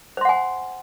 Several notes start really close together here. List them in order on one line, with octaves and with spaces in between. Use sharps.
C5 C6 F#5 G#5